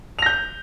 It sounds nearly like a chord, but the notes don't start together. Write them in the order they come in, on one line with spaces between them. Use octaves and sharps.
F7 A#6 G6